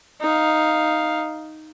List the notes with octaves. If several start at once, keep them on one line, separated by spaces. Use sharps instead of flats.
D#4 F5